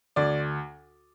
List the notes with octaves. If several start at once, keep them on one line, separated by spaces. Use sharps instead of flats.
D2 D5